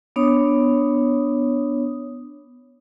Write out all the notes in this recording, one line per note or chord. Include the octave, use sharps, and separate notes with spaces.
B3 D4 C#5 D#6